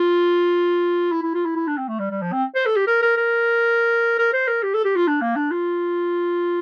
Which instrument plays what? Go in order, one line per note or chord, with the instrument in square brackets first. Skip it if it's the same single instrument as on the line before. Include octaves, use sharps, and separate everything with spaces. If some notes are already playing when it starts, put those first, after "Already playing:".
Already playing: [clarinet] F4
E4
E4
F4
E4
E4
D4
C4
A3
G3
G3
F3
C4
C5
A4
G4
A#4
A#4
A#4
A#4
C5
A#4
G4
A4
G4
F4
D4
A#3
D4
F4